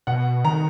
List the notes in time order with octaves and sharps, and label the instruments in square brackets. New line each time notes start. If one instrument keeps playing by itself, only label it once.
[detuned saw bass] B2 [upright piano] F#5
[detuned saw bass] D#3 [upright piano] A#5